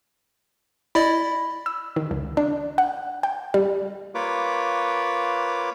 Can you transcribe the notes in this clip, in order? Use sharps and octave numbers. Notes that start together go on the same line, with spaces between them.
E4 D5 D#5 B5
E6
D#3
C#2
D4
F#5
G5
G3
A#3 F4 B4 C#5 D6